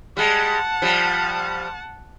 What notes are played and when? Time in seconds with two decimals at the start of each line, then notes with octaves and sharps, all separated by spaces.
0.17 G3 G#3 F#5 A5
0.82 F3 G3